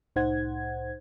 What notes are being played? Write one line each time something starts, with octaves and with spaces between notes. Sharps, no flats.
C2 A2 D#4 C5 F#5 G#6